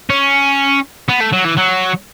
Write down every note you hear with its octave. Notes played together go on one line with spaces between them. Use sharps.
C#4
B3
A3
F#3
E3
F#3